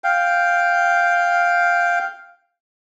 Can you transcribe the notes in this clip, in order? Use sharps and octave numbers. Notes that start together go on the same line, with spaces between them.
F5 G5